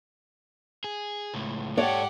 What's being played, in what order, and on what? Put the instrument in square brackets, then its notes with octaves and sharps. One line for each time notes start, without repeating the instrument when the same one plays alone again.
[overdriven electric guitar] G#4
C#2 A2
[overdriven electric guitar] G#2 A4 [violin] G4 F#5 [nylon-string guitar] C#5 D5